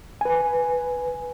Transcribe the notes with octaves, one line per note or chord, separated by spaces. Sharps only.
B4 G#5